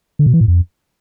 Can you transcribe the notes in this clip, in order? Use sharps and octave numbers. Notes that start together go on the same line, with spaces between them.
D3
B2
E3
A2
F2